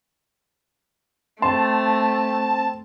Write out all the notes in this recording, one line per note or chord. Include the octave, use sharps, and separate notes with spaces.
A3 C4 A5 C6